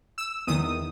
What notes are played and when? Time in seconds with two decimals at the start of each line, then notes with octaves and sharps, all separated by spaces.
0.18 E6
0.47 E2 D#3 D#6